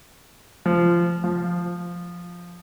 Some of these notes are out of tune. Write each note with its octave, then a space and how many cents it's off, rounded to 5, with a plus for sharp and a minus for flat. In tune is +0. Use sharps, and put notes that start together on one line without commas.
F3 -15
F3 +5